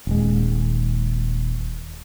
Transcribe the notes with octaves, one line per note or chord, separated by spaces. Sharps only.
D#1 G#3